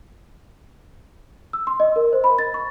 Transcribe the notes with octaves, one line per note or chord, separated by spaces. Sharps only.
E6
C6
D#5
A#4
C5
B5
A6
C#6